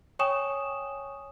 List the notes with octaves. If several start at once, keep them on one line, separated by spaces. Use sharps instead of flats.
C#5 G5 G#5 C#6 D#6 E7